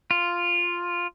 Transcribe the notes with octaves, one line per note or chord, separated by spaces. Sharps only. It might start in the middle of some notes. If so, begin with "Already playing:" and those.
F4